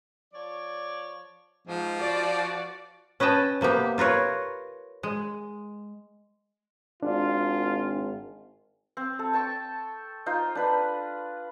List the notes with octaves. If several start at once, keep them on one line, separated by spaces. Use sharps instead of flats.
F3 C#5 D5
G#2 F3
F4 F#4 D5
C#4 B4 D#5 G5 A5
C3 A#3 B3 G4
F4 A#4 B4 C#5
G#3
G#1 D4 F4
C4
A4
G5 A5 C#6
D#4 F4 C5
D4 B4 B5